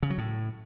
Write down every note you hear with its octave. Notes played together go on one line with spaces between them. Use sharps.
C#3
F#3
A2